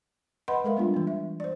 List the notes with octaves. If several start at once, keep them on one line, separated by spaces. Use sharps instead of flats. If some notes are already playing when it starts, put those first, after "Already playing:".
B4 D#5 F#5 B5 C6
G#3 A4 A#4 E5 F5
G3 B3 D4 F4
E3 B3
E5
C5 D5